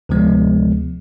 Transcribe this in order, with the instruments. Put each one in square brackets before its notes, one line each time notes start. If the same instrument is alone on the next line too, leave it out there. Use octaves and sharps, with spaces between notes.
[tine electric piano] D2 C3 F3 G#3 B3